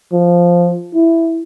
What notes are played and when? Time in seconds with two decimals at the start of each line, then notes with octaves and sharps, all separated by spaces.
0.13 F3
0.94 E4